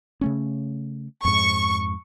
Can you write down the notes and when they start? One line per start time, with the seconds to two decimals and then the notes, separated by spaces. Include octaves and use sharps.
0.21 C#3 A3 C#4
1.25 F2 G#2 C#6